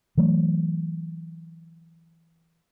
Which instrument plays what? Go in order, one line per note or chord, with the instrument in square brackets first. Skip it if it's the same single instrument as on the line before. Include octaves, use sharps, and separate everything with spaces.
[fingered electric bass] E3 F#3 A3